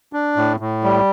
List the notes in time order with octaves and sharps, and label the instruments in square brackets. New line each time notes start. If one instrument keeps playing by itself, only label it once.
[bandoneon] D4
A2
A2
G3